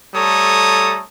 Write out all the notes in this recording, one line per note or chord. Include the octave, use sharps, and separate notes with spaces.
G3 A3 A4 C#5 A#5 D#6